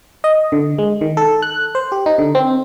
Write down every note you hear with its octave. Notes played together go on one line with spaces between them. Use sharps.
D#5
D3
G#3
D#3
A4
F#6
C5
G4
D#4
D3
C4